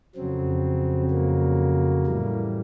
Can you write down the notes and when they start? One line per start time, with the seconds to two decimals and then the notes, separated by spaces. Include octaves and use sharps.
0.16 F2 C#3 F#3 C4
1.11 A#3
2.07 A2 E3 G3